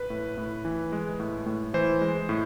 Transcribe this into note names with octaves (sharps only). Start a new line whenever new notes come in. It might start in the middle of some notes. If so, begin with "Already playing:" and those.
Already playing: B4
A2
A2
E3
G#3
A2
A2
E3 C5
G#3
A2